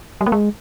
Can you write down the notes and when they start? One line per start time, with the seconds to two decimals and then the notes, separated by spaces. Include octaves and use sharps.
0.21 G3
0.26 A#3
0.32 G#3